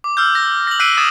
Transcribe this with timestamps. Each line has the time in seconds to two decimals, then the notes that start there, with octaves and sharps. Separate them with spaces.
0.04 D6
0.17 E6 F6 G6
0.35 A#6
0.67 A#6 F#7
0.80 E6 F#6 B6 C7 D7 D#7
0.97 D#6 G#6 A6 E7